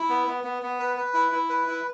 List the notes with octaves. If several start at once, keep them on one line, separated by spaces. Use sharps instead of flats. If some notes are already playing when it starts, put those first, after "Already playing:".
Already playing: E4
B3
B3
B3
B3
B4
B4
E4
E4
B4
E4